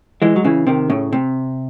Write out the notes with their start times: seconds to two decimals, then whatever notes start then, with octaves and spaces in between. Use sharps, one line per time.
0.22 E3 G#3
0.36 F#3
0.44 C#3 E3
0.67 C3 D#3
0.90 A2 C#3
1.13 C3